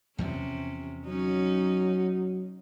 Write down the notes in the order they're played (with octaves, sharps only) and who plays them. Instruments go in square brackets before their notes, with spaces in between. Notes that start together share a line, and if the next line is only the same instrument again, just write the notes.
[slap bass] E2 E3 F3 [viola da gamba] C3 C#4
[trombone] F#3 [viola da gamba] C#4 D#4